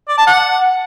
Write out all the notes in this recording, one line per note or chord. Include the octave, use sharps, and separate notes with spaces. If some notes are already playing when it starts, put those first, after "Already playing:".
D5
A5
F#5